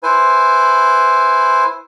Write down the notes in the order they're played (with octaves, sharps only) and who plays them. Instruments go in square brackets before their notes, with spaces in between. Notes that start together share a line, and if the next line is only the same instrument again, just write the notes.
[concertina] E4 B4 C5 G#5